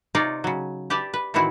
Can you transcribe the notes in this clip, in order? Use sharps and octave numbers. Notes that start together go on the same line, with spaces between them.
C3 D#4 F4 C#5 D5
C#3 F#3
G4 B4 D5 E5 A5
B4
A2 D#3 E3 C4 E4 F#4